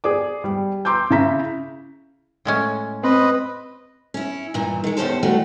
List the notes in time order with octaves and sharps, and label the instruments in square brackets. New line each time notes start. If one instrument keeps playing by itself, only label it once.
[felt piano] G#4 D5 D6
G3
A#5 C6 D6 E6 G6
C#3 E4 E5 A#5 B6
[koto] A2 G#3 C#4
[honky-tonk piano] C4 [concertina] B4 D#5
[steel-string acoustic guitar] C#4 E4
G2 A#2 E3
D#3 G#3
E2 G2 C#4 G4 A4 C5
D#3 E3 G3 A3 F#4